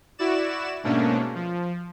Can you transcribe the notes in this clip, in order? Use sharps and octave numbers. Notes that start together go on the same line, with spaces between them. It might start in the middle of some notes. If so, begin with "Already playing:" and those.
E4 F#4 D5 E7
G#2 B2 A3 A#3 C#4 D4
F3